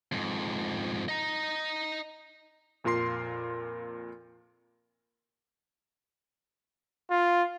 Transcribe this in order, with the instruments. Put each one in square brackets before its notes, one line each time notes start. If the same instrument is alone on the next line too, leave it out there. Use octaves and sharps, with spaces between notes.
[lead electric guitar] F2 G#2
D#5 A#5
[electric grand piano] F2 A#2 F4 A#4 C6 C7
[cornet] F4